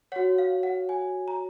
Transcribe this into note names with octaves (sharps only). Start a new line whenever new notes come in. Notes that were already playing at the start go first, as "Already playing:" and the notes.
F#4 C#5 F#5
F5
F#5
G#5
A#5